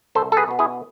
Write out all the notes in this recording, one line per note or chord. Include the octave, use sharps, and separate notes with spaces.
C2 A4 C5
A4
G#4 B4
B2 B3
E4 G#4